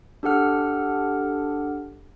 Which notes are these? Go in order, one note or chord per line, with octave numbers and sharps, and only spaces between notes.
D4 G4 A4 F#5 F6